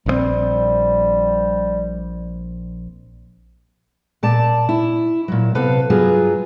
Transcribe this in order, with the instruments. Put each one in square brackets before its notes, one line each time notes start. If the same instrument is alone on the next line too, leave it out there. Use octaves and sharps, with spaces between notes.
[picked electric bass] A#1 C#3 C4 [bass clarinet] G3
[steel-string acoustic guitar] A#2 D5 A5
E4
A#2 F#3
C3 B3 A4 B4 F5
G2 F#3 B3 F4 G#4